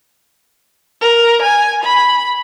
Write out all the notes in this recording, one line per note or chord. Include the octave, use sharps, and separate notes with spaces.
A#4
G#5
B5